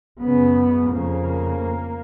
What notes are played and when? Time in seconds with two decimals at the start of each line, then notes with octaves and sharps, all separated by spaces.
0.20 F#2 C#3 B3
0.91 F2 C#3 A#3